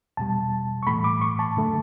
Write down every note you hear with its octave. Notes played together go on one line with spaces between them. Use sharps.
E2 B2 G3 A5
C#6
A2 E3 A3 B5
D6
C#6
A5
F#2 D3 A3